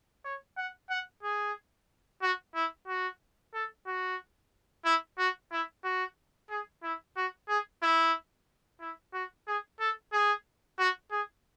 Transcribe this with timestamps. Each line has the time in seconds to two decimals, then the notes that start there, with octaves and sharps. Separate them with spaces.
0.25 C#5
0.57 F#5
0.90 F#5
1.23 G#4
2.22 F#4
2.55 E4
2.88 F#4
3.54 A4
3.87 F#4
4.85 E4
5.19 F#4
5.52 E4
5.84 F#4
6.50 G#4
6.83 E4
7.17 F#4
7.49 G#4
7.83 E4
8.81 E4
9.14 F#4
9.47 G#4
9.80 A4
10.13 G#4
10.79 F#4
11.11 G#4